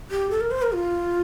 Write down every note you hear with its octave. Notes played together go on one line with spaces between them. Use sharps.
G4
A4
A#4
C5
A#4
F4